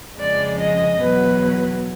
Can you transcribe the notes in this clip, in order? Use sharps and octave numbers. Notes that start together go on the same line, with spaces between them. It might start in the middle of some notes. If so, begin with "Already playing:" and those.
F2 C#3 F3 G#3 D5
D#5
E2 B2 F#3 B4